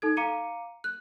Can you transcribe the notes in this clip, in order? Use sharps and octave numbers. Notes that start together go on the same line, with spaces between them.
D#4 A4 G#6
F5 A#5 D6 C#7 D#7
F#6